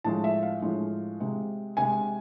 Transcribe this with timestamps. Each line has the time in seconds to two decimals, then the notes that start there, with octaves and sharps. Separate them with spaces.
0.04 A2 F3 G#3 A5
0.24 E5
0.42 F5
0.62 A2 F3 G#3
1.20 C3 G#3
1.77 C3 G#3 G#5